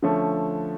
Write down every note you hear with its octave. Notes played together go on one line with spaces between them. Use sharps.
D3 F3 A3 C#4